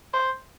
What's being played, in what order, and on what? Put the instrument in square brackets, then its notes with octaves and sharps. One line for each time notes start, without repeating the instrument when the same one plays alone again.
[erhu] C5